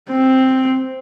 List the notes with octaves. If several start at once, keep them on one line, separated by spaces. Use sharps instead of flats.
C4